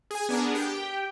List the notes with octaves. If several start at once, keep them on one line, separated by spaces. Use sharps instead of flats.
G#4 G#5
B3 D4 G#4 A#4
G4 G5